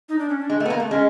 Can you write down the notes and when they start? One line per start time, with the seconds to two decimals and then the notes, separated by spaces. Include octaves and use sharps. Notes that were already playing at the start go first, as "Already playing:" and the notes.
0.09 D#4
0.19 D4
0.29 C#4
0.39 D4
0.50 G#3
0.60 A3
0.66 B3
0.70 A#3
0.80 A3
0.87 C4
0.90 G#3 C#4